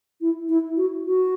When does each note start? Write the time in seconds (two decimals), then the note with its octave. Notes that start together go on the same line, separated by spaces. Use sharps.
0.21 E4
0.49 E4
0.77 F#4
1.05 F#4